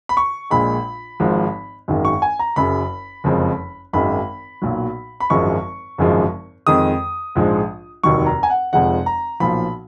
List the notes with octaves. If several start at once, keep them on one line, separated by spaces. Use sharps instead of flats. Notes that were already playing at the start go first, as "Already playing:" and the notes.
B5
C#6
A#1 A#2 G#3 B5
G#1 G#2 F3
G#1 F#2 D#3 G#3
C#6
G#5
A#5
F#1 F#2 C#3 B5
F#1 F2 F3 G#3
G#1 F#2 D#3 G#3 B5
B1 A#2 F#3
B5
G#1 F#2 F3 G#3 C#6
G#1 F#2 C#3 F3 G#3
F2 D#3 G#3 D#6
A#1 G#2 F3 G#3
F1 D#2 D#3 F#3 C#6
A#5
G#5
F#5
F1 F2 F3 G#3 F#5
A#5
B1 A#2 F3 B5